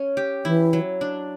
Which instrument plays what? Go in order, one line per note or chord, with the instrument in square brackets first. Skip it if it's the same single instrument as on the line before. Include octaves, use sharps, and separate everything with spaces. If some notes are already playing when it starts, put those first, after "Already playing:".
Already playing: [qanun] C#4
G4
[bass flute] E3 [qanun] E4
[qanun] F#3
D4